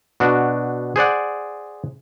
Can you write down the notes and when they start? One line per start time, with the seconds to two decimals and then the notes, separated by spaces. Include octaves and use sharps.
0.20 B2 D4 F#4
0.96 G#4 C5 D5 F#5